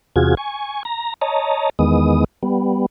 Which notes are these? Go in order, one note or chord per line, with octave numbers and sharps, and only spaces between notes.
E2 C3 F4 F#4 G#4 G#6
G#5 C#6
A#5 A#6
C#5 D#5 A5 A#5
E2 D#3 G#3 B3 D#6
G3 B3